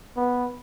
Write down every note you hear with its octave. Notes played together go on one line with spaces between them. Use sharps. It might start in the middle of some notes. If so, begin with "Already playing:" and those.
B3